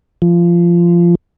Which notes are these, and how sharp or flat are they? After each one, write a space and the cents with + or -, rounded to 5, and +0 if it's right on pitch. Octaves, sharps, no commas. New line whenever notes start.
F3 -20